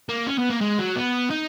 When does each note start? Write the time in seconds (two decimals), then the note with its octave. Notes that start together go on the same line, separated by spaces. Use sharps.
0.09 A#3
0.27 C#4
0.38 B3
0.50 A#3
0.61 G#3
0.79 F#3
0.96 B3
1.30 D#4